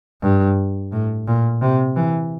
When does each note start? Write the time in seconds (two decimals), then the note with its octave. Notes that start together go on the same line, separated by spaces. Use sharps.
0.22 G2
0.92 A2
1.28 A#2
1.62 C3
1.96 E3